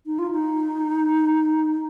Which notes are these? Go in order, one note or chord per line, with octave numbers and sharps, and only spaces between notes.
D#4
F4
D#4